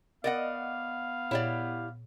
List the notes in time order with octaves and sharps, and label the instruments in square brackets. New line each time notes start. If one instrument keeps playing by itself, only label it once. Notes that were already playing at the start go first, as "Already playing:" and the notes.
[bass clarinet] B3 [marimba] A#4 [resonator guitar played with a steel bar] D5 D#5 F#5 [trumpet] F5
[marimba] A#2 C#5 B5 [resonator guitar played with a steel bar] E4 G4 D5